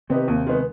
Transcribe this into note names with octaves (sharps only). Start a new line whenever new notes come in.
C3 D#3 B3 C4 D#4 G4
D#2
D#3 G#3 B3